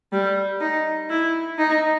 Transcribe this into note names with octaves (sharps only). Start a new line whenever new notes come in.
G3
D#4
E4
D#4